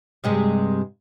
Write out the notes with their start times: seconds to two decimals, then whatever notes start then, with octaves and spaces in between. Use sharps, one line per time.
0.24 G2 C3 G#3